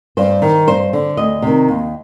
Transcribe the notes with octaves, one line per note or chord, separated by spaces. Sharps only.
G2 C5
D#3
G2 C5
D3
D2 D#5
C3 D#3
D#2